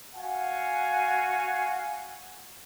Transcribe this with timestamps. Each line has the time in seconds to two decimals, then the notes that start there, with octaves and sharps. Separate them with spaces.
0.15 F#4 F5 F#5 G#5